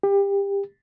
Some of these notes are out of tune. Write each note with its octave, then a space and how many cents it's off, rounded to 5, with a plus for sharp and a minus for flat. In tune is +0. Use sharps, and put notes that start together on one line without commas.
G4 +25